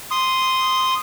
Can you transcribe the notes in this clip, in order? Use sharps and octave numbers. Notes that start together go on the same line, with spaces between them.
C6 D#6